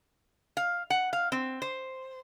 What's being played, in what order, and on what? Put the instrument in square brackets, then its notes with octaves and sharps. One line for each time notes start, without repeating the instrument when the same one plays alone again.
[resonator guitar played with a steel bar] F5
F#5
F5
C4
C5